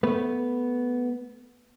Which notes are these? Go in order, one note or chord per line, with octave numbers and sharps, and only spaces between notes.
A3 B3 B4